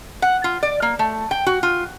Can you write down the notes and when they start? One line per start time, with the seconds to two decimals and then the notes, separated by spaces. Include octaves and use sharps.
0.22 F#5
0.44 F4
0.63 D5
0.82 A#3
0.99 A3
1.31 G5
1.46 F#4
1.63 F4